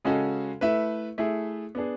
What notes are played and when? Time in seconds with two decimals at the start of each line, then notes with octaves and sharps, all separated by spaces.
0.05 C#3 G#3 C#4 F#4 A4
0.61 A3 E4 B4 E5
1.18 A3 E4 G#4
1.75 B3 D4 G#4